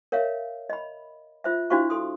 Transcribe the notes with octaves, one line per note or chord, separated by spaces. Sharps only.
A#4 C#5 E5 F5
D#5 B5
F4 C5 E5
D4 E4 F#4 C5 F5 C#6
A4 C6 D#6